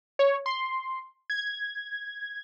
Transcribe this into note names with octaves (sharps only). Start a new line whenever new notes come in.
C#5
C6
G#6